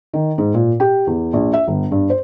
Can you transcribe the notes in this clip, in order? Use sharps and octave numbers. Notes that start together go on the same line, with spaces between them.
D#3
G#2
A#2
G4
E2
A#1
E5
G1
G2
C5